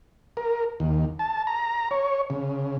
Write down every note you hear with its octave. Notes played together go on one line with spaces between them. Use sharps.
A#4
D#2
A5
A#5
C#5
C#3